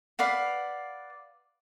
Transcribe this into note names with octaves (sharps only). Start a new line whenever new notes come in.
B4 D5 F5 F#5